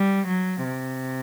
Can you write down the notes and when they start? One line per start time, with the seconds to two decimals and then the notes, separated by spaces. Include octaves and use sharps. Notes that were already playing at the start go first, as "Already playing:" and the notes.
Already playing: G3
0.27 F#3
0.64 C3